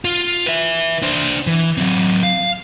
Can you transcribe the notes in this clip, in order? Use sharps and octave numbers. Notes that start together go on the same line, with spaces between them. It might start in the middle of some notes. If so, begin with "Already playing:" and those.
F4
B4 E5
D4 C5
E3
F#3 C4
F5